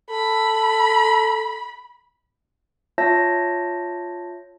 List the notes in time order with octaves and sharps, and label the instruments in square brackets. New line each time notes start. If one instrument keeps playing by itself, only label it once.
[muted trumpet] A4 [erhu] B5
[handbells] F4 C#5 E5 A5 G6 A#6